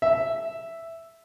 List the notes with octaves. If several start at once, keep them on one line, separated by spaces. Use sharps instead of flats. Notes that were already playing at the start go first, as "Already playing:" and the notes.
E5